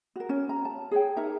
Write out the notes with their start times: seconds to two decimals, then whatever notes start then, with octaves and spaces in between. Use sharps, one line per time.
0.16 F#4 A#4
0.29 C#4
0.49 A#5
0.65 A5
0.91 G#4 C#5 G5
1.17 D#4 A#4 E5 A#5